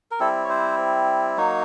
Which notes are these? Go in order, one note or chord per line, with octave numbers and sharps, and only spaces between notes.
A#4
G3 C4 E4 A4
C#5
C5
F#3 A#3 D#4 C#5